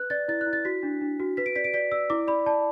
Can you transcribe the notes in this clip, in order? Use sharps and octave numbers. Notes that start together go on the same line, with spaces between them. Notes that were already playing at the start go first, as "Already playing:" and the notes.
Already playing: B4 F#6
D5 A6
E4 A6
F#6
E4
A6
F#4 B6
D4
D4
F#4
B4 B6
D7
D5 B6
D7
D5 B6
D5 E6
E4 D6
D5 B5
D5 A5